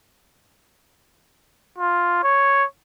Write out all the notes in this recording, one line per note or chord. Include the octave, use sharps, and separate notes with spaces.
F4
C#5